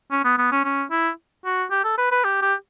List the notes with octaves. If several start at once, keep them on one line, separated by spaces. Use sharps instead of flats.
C#4
B3
B3
C#4
C#4
E4
F#4
G4
A4
B4
B4
G4
G4